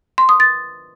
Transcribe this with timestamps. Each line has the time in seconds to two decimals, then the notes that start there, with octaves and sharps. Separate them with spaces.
0.18 C6
0.29 D#6
0.40 A6